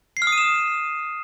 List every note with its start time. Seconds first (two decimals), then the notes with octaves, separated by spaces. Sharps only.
0.17 C7
0.22 F6
0.27 D#6
0.32 D#7
0.38 E7